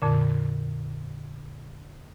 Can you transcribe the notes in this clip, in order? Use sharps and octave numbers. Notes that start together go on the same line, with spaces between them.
F2 A#2 D3